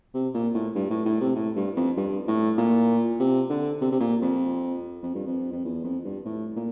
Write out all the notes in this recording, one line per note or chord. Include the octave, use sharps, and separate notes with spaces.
C3
A#2
A2
G2
A2
A2
C3
A2
G2
F2
G2
A2
A#2
C3
D3
C3
C3
A#2
F2
F2
G2
F2
F2
E2
F2
G2
A2
A#2